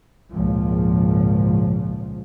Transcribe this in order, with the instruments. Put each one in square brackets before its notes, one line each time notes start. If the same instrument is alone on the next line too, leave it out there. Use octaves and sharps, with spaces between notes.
[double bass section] G#1 C#2 A#2 F3